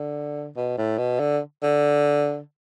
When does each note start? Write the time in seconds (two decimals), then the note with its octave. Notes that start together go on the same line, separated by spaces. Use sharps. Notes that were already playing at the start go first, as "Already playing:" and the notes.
Already playing: D3
0.56 B2
0.78 A2
0.98 B2
1.20 D3
1.63 D3